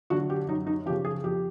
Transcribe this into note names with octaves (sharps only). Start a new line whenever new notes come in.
D3 F#3 F#4
G4
F#2 D#4
D#4
C#3 F3 G4
G#4
F2 G4